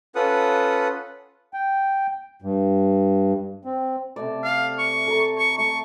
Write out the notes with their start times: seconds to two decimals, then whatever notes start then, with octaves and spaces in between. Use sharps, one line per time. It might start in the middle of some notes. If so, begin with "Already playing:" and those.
0.15 C#4 F4 A4 B4 F#5 D#6
1.54 G5
2.42 G2
3.65 C4
4.16 C3 A3 D5
4.44 F5
4.78 C#6
5.07 A4 A#4
5.38 C#6
5.58 A3 C#6